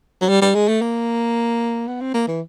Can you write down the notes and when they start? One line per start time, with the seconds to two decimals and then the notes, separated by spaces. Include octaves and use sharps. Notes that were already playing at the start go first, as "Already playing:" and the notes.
0.21 F#3
0.29 G3
0.42 G3
0.55 G#3
0.68 A3
0.82 A#3
1.87 B3
2.01 C4
2.14 A#3
2.27 E3